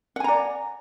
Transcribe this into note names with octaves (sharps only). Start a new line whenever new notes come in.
D5 F#5 G#5 A#5